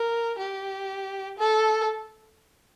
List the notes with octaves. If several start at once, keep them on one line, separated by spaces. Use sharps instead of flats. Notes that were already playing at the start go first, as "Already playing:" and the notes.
Already playing: A#4
G4
A4